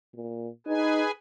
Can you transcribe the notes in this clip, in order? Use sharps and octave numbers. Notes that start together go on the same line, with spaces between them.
A#2
D#4 G#4 B4 G#5